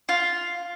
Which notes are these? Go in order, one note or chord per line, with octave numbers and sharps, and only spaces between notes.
F4